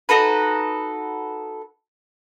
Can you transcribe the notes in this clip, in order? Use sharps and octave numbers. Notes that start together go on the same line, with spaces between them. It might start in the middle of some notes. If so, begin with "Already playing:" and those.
D#4 F#4 A4 B4